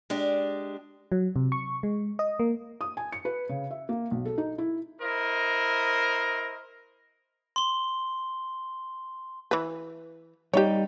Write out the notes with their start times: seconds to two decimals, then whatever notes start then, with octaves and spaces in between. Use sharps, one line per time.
0.10 G#3 D4 G4
1.12 F#3
1.36 C3
1.52 C#6
1.83 G#3
2.19 D#5
2.40 A#3
2.81 D#6
2.97 G#5
3.12 C#7
3.25 B4
3.49 C#3
3.71 E5
3.89 A#3
4.11 B1
4.25 A4
4.38 D#4
4.58 E4
5.00 E4 A#4 C5 D#5
7.56 C6 G7
9.51 E3 B4
10.54 G3 D#4 G4 C#5